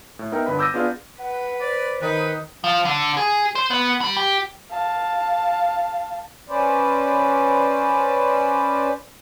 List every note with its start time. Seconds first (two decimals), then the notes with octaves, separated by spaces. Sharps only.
0.19 A2
0.32 B3 D#4 A#4 E5 G5
0.46 G1 D3 B4 B5
0.59 D6 E6 G6 A6 A#6 D#7
0.74 B3 D4 F4 G#4 D5 F5
1.18 B4 F#5
1.61 C5 D5
2.02 D#3 D#4 B4
2.64 F3
2.85 D3
3.17 G#4
3.55 C5
3.71 B3
4.01 G3
4.17 G4
4.70 F5 A5
6.49 C#4 B4 C5 D5